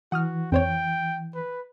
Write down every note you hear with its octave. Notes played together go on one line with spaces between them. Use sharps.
E3 F#4 F#5 D#6 F6
F2 C5 C#5 G5
B4